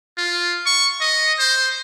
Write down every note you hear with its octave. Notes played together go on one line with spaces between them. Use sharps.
F4
C#6
D#5
C5